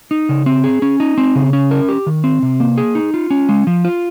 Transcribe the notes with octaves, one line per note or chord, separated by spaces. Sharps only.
D#4
C#3
C4
G#4
C#4
D#4
C4
C#3
C#4
A#4
G4
D#3
C4
C3
A#3
G#4
D#4
F4
C#4
G#3
F3
F4